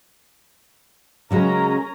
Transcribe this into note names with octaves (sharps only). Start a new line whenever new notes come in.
C#3 F#3 G#3 C#4 A#4 A#5